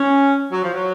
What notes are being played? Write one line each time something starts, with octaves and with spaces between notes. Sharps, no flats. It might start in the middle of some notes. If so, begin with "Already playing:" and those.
Already playing: C#4
F#3
F3
F#3